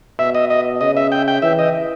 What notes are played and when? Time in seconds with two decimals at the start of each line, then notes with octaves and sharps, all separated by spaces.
0.19 B2 E5
0.35 D#5
0.50 D#5
0.81 C#3 D#5
0.97 E5
1.12 G5
1.28 G5
1.42 E3 E5
1.59 D#5